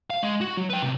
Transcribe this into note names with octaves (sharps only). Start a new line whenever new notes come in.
F5
G#3
F#4
F#3
B4 G5
A2 C3